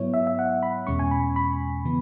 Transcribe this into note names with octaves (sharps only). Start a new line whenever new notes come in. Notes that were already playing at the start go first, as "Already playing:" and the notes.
Already playing: G#2 F#3 B3 E4 C#5
E5
E5
F#5
B5
E2 B2 G#3 C#4 C#6
G#5
B5
B5
C#3 E3 B3